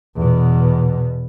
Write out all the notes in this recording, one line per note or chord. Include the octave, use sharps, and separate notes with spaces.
E2 B2